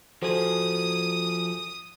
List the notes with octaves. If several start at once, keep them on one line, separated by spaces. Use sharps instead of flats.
F3 F#4 G#4 A4 C5 D#6